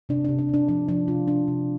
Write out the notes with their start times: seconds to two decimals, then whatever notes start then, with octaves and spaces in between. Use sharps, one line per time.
0.09 C3 D4
0.25 C3 D4
0.39 D4
0.49 C3 D4
0.68 F3 D4
0.88 F3 D4
1.08 C3 F4
1.27 C3 D4
1.48 C3